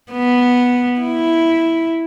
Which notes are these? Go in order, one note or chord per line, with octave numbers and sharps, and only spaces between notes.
B3
E4